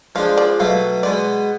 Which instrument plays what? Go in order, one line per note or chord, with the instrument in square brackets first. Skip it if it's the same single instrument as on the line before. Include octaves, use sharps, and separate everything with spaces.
[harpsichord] F3 G#3 D4 [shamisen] F5
[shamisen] D5
[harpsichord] B2 F#3 A3 [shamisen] F5
[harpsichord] B2 G#3 B3 [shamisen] D5